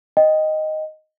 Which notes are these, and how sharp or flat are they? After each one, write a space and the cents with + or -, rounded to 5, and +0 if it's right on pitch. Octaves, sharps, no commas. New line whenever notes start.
D#5 +0 G5 +0